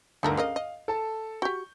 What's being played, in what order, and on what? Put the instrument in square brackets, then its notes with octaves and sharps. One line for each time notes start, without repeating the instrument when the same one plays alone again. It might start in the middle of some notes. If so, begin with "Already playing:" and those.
[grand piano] G1 D2 [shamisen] D#4 A4 A#4
[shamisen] C#3 A#4 D#5 [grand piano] F5
[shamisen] D#5
[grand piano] A4 A5
[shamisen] F#4 G4 [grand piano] C#6 G6